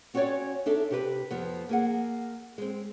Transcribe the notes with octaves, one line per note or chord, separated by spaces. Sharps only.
C4 C#4 F#4 A4 C#5 D5
D4 D#4 A4 E5
C3 G4 B4
F2 F3 B3
A#3 G#4 F#5
G#3 C4